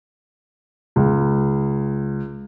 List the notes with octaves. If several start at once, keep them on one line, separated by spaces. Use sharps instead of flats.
C#2